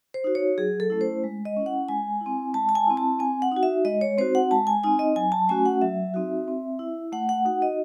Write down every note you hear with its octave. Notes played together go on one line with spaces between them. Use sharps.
C5
D#4 F#4
C#5
F#3 G#4
A4
A3 C#4 E4
C5
G#3
D#5
C#4 E4
F#5
G#3 G#5
E4
C4
G#3 A5
A5
G#5
C4 E4
A5
C4 G#5
F#5
D#4 F#4
E5
G#3 D#5
C#5
C4 D#4 F#4 C5
F#5
G#3 A5
G#5
C4 D#4 G#5
D#5
F#3 G#5
A5
A3 C#4 F#4 G#5
F#5
F#3 E5
C4 D#4 F#4
C4
E4
A3 F#5
F#5
D#4 F#4 F#5
D#5